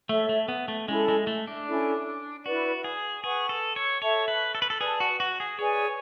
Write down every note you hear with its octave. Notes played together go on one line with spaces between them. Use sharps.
A3 A4 C#5 E5
A3
B3
A3
G#3 C#4 E4 A4
G#3
A3
D4
C#4 E4 A4 D5
E4 F#4 B4 D5
G#4
G#4 B4 F#5 C#6
A4
C#5
A4 C#5 E5 A5
B4
A4
B4
A4
G#4 B4 D5 A5
F#4
F#4
G#4
G#4 B4 C#5 D5 G#5